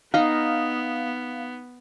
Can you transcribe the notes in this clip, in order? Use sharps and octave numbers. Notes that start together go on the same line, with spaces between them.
B3 D#4 D#5 F5 A#5